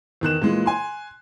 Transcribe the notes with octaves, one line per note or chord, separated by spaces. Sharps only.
E2 D#3 F#6 E7
A#2 E3 G#3
G#5 C6